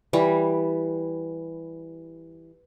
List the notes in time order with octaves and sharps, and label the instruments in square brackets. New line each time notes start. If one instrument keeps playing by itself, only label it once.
[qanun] E3 G3